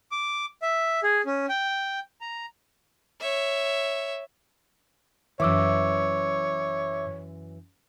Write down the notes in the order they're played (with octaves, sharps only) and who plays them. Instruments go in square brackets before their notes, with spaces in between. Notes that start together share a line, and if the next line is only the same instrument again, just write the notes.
[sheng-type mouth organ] D6
E5
G#4
C#4
G5
A#5
[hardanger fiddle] C#5 E5
[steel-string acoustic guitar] F#2 E3 [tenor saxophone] C#5 [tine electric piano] E5 D6 E6